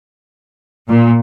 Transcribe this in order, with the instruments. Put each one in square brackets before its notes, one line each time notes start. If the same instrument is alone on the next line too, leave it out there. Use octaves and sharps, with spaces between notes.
[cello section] A#2